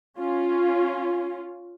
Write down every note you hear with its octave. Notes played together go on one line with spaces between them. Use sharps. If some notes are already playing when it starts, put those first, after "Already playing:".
C#4 F4